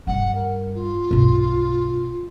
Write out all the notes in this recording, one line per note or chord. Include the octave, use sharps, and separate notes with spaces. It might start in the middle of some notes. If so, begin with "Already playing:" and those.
G2 G3 F#5
A#4
F4
B1 G2